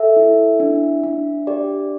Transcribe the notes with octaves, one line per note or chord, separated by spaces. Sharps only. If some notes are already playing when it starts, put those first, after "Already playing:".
Already playing: A4 E5
E4
D4
D4
G4 D5